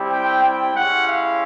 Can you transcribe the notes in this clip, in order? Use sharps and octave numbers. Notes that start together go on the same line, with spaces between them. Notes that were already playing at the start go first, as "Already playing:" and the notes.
Already playing: G3 C4 E4 G4
G5
G5
G#3 C#4 E4 G4 F#5
F5